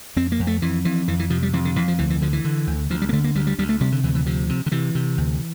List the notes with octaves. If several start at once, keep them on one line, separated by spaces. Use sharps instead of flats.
F2 C4
A#3
F2
A3
F2 E3
F2 E3
F2 E3
E3
C3 F3
G3
F2 E3
D3
F2 E3
F3
D2 E3
E3
D3 F3
E3
D3
D2
D2 F3
G3
A#3
D3 A3
A#3
D2 G3
G3
D2 G3
A3
C3 G3
D3
D2 E3
E3
C3 F3
C3
D3
C3 E3
C3
D2